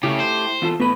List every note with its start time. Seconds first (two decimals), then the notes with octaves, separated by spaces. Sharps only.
0.03 C#3 A3 E4 G4
0.20 C5
0.62 E2 F4 A4
0.80 A2 B3 B4 B5